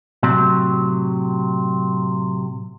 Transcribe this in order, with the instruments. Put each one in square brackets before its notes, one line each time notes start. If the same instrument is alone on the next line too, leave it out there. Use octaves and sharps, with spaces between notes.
[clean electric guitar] A2 C3 F#3